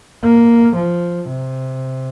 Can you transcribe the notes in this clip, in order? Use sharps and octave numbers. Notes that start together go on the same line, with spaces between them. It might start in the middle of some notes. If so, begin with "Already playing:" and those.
A#3
F3
C3